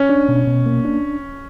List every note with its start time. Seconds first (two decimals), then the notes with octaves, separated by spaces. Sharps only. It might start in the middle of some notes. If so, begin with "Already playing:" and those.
Already playing: C#4
0.09 D4
0.29 B2
0.47 B2
0.66 A#3
0.85 D4